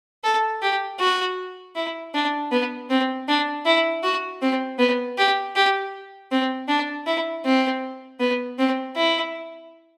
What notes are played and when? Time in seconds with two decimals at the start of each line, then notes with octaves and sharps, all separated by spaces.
0.24 A4
0.62 G4
1.00 F#4
1.76 E4
2.14 D4
2.51 B3
2.90 C4
3.28 D4
3.66 E4
4.03 F#4
4.42 C4
4.79 B3
5.18 G4
5.56 G4
6.31 C4
6.68 D4
7.07 E4
7.45 C4
8.20 B3
8.58 C4
8.96 E4